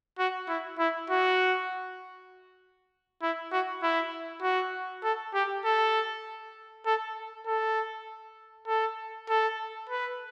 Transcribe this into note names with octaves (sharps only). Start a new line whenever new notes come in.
F#4
E4
E4
F#4
E4
F#4
E4
F#4
A4
G4
A4
A4
A4
A4
A4
B4